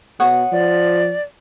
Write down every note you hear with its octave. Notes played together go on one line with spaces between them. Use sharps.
B2 C#5 F#5 D#6
F3 D5